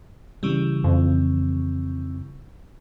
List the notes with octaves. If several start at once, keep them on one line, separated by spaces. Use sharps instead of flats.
C#3 E3 G3
F2